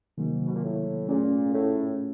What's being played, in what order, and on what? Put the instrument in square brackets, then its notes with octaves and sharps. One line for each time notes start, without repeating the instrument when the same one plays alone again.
[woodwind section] G#2 [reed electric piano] C3 D#3 F#3 A#3
[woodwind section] B2
A#2
A2
[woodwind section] A#2 [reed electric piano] A3 C#4 F4 G#4
[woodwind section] A2